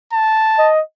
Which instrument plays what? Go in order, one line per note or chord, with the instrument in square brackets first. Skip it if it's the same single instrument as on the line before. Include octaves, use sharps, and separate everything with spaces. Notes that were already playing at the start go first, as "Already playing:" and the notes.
[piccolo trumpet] A5
[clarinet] D#5